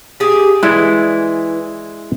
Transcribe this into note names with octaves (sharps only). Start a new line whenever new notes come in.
G4 G#4
E3 G#3 E4 D5